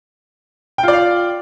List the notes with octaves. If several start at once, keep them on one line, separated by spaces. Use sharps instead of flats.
F4 D5 F5 G5